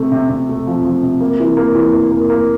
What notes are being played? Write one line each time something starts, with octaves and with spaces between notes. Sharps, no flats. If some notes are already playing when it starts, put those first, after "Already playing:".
Already playing: C3 A3
C3
C3
A3
F3
F3
C3
A#3
E3
A#3
E3
E3
A#3
A#3